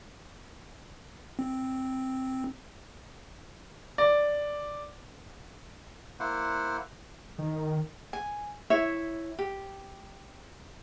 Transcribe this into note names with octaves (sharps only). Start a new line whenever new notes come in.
C4
D5
A#3 E4 C5 F#5
D#3
G#5
E4 C#5 E5
G4